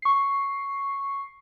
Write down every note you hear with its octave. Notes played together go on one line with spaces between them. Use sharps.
C#6 C7